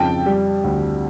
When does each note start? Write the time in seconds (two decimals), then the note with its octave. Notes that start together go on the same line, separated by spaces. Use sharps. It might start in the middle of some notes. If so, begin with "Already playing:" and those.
Already playing: F2 C#3 G5 A5
0.26 G3
0.64 D2